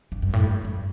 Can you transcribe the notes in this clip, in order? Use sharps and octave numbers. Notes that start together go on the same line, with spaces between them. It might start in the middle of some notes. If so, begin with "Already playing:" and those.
G2
F#2
A2
G2
F#2